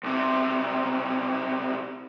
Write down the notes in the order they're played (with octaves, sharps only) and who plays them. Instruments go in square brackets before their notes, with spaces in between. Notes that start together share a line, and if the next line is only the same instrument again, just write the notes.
[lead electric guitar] B1 C3